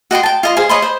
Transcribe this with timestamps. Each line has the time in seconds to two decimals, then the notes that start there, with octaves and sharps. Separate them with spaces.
0.11 F#4 D#5 G5 C6
0.23 G5 A5
0.43 F4 D#5 C6
0.57 G#4 C5 F5 G#5
0.69 C#5 D#5 B5 C6
0.82 C5 B5